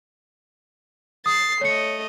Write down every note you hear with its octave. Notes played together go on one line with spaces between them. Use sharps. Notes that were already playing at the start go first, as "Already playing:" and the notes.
D#6 A6 C7
A3 C#5 D#5 C#7